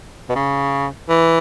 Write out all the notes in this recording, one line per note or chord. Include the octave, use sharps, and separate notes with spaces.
B2
C#3
E3